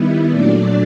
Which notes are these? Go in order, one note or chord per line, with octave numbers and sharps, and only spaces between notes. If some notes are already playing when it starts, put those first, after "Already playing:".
Already playing: D#3 G3 B3 E4
A#2 F#3 A3 D4 D5